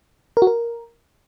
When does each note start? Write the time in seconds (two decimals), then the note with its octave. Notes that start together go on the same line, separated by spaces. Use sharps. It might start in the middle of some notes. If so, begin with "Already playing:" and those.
0.37 A#4
0.42 F#4
0.47 A#4